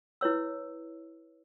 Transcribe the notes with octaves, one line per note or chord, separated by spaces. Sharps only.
E4 B4 C#5 E6